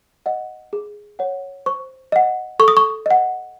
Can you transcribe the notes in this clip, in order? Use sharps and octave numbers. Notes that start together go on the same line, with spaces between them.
D#5 F#5
G#4
C#5 F#5
C5 C#6
D#5 F#5
A4 C#6
D#6
C#6
D#5 F#5